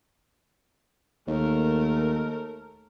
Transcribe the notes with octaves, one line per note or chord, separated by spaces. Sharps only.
D#2 A3 A#4